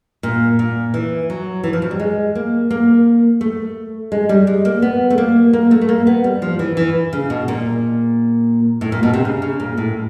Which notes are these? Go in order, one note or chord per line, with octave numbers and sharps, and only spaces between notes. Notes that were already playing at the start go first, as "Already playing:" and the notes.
A#2
A#2
E3
F#3
E3
F3
F#3
G3
G#3
A#3
A#3
A3
G#3
G3
G#3
A#3
B3
A3
A#3
A#3
A3
A3
A#3
B3
G3
F3
E3
E3
C#3
B2
A#2
A2
A#2
B2
C3
C#3
C#3
A#2
A2